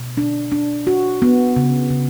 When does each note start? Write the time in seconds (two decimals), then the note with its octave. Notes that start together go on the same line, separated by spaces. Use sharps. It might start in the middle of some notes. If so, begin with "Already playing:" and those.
Already playing: B2
0.17 D4
0.52 D4
0.87 F#4
1.22 B3
1.56 C#3
1.90 C#3